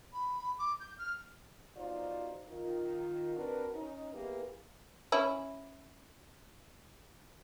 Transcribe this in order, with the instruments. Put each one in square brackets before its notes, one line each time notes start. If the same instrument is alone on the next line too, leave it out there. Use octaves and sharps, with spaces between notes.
[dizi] B5
D6
G6
F6
[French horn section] E2 D#4 F4 F#4 C5 D5
D#3 F4
C4 D4 F#4 A#4 B4
C#4 D#4
A#3 B3 E4 G4 G#4 B4
[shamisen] C#4 E4